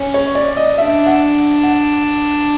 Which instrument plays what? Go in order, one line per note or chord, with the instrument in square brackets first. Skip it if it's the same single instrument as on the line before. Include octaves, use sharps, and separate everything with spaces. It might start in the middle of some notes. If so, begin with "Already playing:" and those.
Already playing: [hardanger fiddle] C#4
[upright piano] C#5
D5
D#5
[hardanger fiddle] D4 [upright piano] E5
[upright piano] F#5
F#5